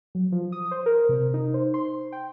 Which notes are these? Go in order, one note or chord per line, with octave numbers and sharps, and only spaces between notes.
F#3
F3
D#6
C5
A#4
C3
D#4
C5
C6
G5